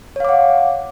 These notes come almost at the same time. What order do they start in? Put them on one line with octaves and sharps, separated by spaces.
C#5 F5 D6 F#5